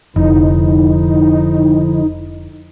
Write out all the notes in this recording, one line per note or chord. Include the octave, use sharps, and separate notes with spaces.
F1 D3 F3 D#4 E4